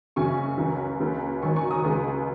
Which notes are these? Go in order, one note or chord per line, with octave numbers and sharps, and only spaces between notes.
F#1 F#2 C#3 G#5 C#6
C#2 C#3 F#3
C#2 C#3 A#3
G#1 G#2 D#3 F#3 G#5 C#6
G#5 C#6
A#5 D#6
C#2 C#3 G#3